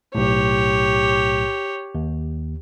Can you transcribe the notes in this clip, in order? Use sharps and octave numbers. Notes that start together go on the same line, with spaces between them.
B1 A2 G4 C#5
D#2